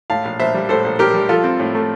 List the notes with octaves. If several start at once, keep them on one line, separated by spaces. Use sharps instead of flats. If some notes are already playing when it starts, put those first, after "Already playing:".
A2 F5 A5
A#1
A#1 C5 E5
G3
A2 A4 C5
A#1
A#1 G4 A#4
G3
F3 F4 A4
C4
A2
A3